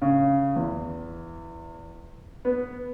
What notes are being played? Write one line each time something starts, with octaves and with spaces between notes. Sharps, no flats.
C#3
E2
B3